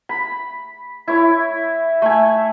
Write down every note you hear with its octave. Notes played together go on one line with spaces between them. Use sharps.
B5
E4 C#5
A3 G#5